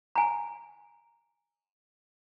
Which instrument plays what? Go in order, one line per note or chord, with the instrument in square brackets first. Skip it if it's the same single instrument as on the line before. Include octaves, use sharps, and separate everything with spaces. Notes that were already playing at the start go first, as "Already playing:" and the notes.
[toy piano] G#5 A#5